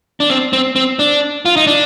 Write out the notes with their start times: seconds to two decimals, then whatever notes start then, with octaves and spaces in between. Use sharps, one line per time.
0.20 D4
0.30 C4
0.53 C4
0.76 C4
0.99 D4
1.45 F4
1.56 D#4
1.67 D4